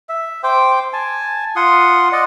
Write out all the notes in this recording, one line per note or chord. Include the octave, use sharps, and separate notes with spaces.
E5
C5 G5 D6
G#5 A5
F4 F#5 C6 D#6
D5 D#5 F#5